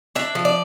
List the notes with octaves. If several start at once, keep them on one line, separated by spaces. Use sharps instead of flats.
D4 E5
F3
D5